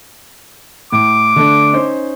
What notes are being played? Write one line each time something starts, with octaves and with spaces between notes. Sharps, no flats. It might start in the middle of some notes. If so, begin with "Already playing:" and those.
A2 D6
D3 A3 D4
C#4 D#4 C5